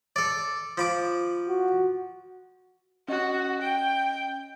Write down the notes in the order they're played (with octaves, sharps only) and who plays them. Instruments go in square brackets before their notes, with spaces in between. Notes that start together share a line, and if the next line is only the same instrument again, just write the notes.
[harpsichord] A4 D5
F3 B5 D6
[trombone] F#4
[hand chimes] C#4 D#5 [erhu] F#4
[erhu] G5